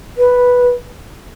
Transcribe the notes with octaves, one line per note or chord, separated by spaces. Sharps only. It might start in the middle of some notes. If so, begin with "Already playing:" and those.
B4